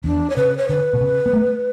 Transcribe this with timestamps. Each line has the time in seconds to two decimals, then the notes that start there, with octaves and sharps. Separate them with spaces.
0.04 E2 D4
0.30 C#5
0.36 C#3 B4
0.58 C#5
0.68 D3 B4
0.93 B2
1.01 C#3
1.26 B3
1.33 A3